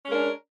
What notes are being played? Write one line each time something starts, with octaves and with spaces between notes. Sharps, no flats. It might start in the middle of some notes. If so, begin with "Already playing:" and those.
G#3 C#4 D4 A#4